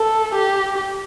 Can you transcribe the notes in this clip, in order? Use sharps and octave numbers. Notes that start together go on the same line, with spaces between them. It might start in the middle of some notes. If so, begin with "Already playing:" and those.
Already playing: A4
G4